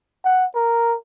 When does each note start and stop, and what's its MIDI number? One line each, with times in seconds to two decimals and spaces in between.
0.25 0.45 78
0.55 0.96 70